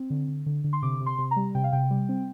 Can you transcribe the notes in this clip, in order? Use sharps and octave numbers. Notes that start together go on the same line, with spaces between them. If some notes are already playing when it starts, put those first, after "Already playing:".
Already playing: C4
D3
D3
D3
D3
C6
C3 D6
C3
C6
C3
A#5
G3
C3 G5
F5
C3 G5
G3
C4